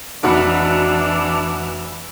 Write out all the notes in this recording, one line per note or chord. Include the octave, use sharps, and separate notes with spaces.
F1 E3 D4 F#4 B5